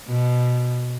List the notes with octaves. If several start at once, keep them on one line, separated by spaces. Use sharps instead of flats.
B2